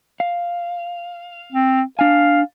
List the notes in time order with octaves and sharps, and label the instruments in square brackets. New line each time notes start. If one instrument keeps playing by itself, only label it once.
[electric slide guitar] F5
[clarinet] C4
[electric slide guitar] D4 G#5 [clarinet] F5